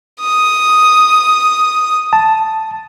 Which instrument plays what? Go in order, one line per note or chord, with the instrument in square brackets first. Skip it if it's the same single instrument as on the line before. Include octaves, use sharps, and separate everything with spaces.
[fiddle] D#6
[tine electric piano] A5